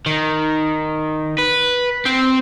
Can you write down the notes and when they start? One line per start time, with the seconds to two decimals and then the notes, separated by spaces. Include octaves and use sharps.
0.06 D#3
1.38 B4
2.05 C4